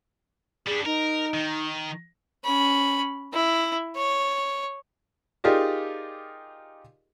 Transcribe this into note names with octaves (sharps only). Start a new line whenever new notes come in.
G3 D4 G#4
D#4 A#4
D#3
C#4 B5
E4
C#5
D#4 F4 G4 G#4 A#4 D5